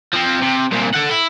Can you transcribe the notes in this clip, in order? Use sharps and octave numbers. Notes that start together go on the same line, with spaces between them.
F3 C4
C3
C2 A#2
A4 F#5
E4